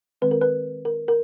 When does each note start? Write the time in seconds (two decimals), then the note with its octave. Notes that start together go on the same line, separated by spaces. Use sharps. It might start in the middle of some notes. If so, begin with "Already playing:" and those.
0.22 D#3 G#3 C4 B4
0.31 A#4
0.41 B4
0.85 A#4
1.08 A#4